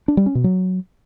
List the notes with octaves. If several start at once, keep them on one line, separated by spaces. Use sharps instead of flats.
D4
G3
C#4
B2
F#3